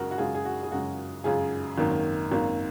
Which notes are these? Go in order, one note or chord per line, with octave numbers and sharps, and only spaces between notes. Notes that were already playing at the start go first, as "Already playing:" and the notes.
Already playing: F#2 C#3 G#3 F#4 A#4
F#4
F#2 C#3 G#3 F4 G#4
G#4
F#4
G#4
F#2 C#3 G#3 F#4
F#2 C#3 G#3 F4 G#4
G#1 F#2 D#3 A#3
G#1 F#2 D#3 A#3